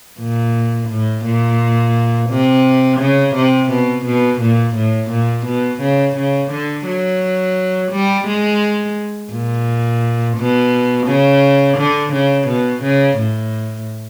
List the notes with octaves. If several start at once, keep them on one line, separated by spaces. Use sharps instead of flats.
A#2
A2
A#2
C3
C#3
C3
B2
B2
A#2
A2
A#2
B2
C#3
C#3
D3
F#3
G3
G#3
A#2
B2
C#3
D3
C#3
B2
C#3
A2